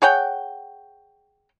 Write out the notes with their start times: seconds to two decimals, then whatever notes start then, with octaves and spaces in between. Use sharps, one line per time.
0.02 G#4 C#5 F#5 G5